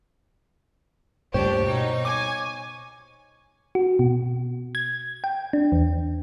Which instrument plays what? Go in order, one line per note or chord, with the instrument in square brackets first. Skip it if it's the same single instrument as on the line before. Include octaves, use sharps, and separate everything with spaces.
[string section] D2 D4 G4 [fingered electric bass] G2 A#2 C#3 [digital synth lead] C5 [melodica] C#5
[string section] B2 D#4
[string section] G#5 [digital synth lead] D6
[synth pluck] F#4
B2
G#6
G5
D4
E2